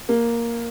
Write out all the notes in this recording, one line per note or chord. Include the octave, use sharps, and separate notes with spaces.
A#3